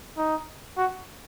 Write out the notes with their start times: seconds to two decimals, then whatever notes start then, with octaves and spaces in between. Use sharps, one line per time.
0.17 D#4
0.77 F#4